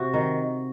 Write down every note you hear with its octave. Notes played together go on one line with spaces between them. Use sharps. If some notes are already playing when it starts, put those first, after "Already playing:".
Already playing: C3 F#4
D#3